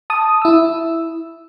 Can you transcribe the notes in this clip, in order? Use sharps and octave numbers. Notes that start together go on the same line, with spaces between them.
A5 D#6
E4 E6